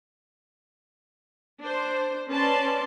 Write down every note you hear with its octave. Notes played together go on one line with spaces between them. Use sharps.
D4 C5
C#4 B4 D5 A5 C6